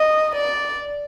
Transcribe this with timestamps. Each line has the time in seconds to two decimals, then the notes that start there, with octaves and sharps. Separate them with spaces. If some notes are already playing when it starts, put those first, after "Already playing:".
Already playing: D#5
0.35 D5